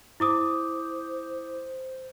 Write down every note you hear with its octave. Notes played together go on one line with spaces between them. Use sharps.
E4 C5 D6 D#6